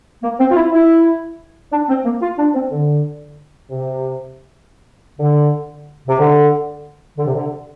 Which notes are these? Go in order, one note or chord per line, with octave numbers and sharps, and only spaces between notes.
A#3
C4
F4
E4
E4
D4
C4
A#3
F4
D4
C4
D3
C3
D3
C3
D3
D3
C3
D3